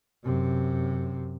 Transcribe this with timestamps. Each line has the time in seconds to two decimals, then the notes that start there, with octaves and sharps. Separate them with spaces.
0.24 F#2 C3